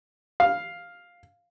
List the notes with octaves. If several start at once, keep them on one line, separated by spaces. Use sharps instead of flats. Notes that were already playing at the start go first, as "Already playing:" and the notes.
F5